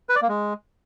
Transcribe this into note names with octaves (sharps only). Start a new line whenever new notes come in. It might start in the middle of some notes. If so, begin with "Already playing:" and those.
B4
D5
A#3
G#3